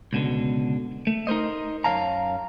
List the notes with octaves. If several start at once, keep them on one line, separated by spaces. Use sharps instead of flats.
C#2 B2 D3
A3
D#4 A#4 C5 D#5
F#2 F#3 C#5 F5 A5 A#5